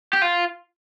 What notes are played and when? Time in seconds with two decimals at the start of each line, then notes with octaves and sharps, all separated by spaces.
0.13 G4
0.22 F4